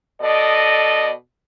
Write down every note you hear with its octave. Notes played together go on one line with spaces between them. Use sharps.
B2 A4 D5 D#5